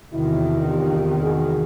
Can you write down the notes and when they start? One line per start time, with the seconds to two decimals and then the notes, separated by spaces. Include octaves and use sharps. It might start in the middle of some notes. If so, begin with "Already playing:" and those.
0.12 E2 C3 D#3 E4 F#4
0.68 F4 G4
1.22 F#4 G#4